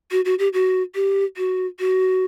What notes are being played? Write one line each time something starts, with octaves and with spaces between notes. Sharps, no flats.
F#4
F#4
G4
F#4
G4
F#4
F#4